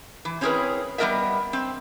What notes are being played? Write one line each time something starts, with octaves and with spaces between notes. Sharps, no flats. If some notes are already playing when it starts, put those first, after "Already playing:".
E3
C4 C#4 E4 G#4 A#4 B4
G3 B3 F#4 A#4 D#5 E5
C4